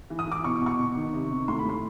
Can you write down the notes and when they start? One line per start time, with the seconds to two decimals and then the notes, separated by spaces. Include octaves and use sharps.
0.10 E3
0.19 D#6
0.27 E3 D6
0.44 B2 C#6
0.55 D6
0.61 B2 C#6
0.79 B2
0.96 D#3
1.13 C3
1.31 D#3
1.48 A2 C6
1.59 B5
1.65 A2 C6